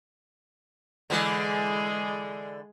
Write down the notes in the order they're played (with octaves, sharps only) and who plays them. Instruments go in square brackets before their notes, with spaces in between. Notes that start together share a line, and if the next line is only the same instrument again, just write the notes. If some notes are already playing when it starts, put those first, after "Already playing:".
[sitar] D3 E3 [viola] G#3 G#4